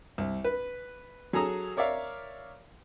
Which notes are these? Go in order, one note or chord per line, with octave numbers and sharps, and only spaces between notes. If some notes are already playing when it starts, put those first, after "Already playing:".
C2
B4
F#3 G#4 A4 A#5 D#6
A#4 C#5 D5 E5 F5